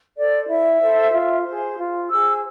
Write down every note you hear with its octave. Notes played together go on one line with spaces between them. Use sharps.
A4 C5 D5
E4 E5
A4 C5
F4
G#4 C5
F4
G#4 C5 E6